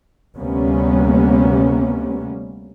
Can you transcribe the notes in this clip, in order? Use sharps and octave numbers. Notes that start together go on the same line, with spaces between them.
D2 C3 G3 A#3 B3 C#4